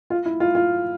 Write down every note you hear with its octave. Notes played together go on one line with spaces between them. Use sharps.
F4
E4
F4
F4